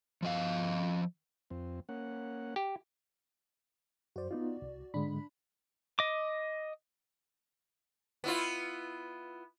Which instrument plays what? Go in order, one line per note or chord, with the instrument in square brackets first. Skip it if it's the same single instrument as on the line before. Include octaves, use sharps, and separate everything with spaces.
[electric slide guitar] F3 D#5 F5
[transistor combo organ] F2 C4
A#3 C#4 F#5
[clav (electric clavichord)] G4
[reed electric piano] F#2 C5 [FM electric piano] F#4 D5
[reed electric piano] B3 D#4 F4
C2
[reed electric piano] G#2 D3 G#3 [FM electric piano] D4 B5
[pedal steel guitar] D#5 D6
[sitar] B3 E4 F4